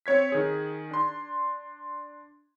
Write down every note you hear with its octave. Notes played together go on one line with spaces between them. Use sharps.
C4 C#5 G#6 B6
D#3 G#4
D4 C6